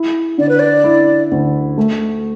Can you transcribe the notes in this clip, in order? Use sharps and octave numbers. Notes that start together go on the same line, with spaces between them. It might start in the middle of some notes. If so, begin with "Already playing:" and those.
Already playing: E4
D3 D5
B4
D5
E4
D2
A3